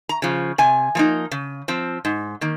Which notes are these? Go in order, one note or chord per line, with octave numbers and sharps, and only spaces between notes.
A#5
C#3 F3
C3 G#5
F3 A#3 D#4
C#3
F3 C4
G#2
D#3 A#3